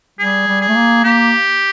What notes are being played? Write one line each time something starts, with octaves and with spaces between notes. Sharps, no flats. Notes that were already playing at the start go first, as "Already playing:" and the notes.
G3 G#4
G3
G#4
A3
A#3
A#3 G4